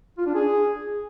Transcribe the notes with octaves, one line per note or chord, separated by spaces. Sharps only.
F4
D4
G#4